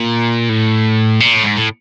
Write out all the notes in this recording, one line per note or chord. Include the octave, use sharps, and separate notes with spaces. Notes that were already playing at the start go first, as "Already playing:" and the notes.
Already playing: A#2
A2
A#2
A2
G#2
A2